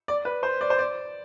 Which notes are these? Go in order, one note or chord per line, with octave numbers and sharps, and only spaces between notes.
D5
B4
C5
D5
C5
D5